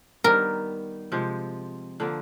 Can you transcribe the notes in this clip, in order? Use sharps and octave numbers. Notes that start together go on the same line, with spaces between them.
D#3 G3 B3 A#4
C3 F3 G#3
D3 F3 A#3